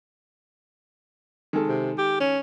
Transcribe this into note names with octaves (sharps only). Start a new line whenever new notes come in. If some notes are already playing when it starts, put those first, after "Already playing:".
D#3 G#3 A4
C3
G4
C#4